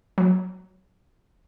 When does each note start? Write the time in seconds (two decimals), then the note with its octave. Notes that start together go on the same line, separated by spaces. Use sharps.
0.18 F#3